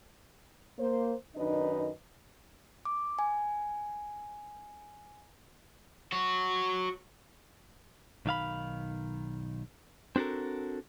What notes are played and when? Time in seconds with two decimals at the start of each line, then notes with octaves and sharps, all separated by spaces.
0.78 A#3 C5
1.36 F#2 D#3 D4 D#4 B4 D#5
2.85 D6
3.19 G#5
6.12 F#4 C#5
8.26 B1 D#3 F5 B5
10.16 C4 D4 F#4 A4 A#4